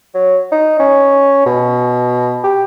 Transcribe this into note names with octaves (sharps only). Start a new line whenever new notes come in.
F#3
D#4
C#4
B2
G4